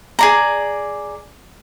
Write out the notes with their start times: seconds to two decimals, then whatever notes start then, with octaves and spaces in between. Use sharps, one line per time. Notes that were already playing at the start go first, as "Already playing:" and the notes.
0.19 G#4 D5 A#5